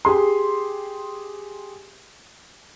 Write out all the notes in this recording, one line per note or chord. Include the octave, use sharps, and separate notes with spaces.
G4 G#4 C6